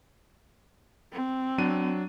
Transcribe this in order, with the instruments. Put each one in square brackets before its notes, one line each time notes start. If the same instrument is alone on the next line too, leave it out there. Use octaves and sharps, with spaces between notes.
[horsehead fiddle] C4
[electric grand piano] F#3 D4 D#7